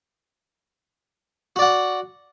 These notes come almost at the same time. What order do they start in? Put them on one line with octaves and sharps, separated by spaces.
F#4 D5 F#5